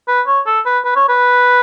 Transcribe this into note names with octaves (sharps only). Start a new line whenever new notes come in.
B4
C#5
A4
B4
B4
C#5
B4